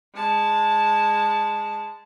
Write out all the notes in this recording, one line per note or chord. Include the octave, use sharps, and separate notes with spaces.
G#3 A5